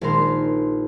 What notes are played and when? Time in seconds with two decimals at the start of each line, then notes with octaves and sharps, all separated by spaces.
0.01 A#1 D#3 G#3 A#4 C6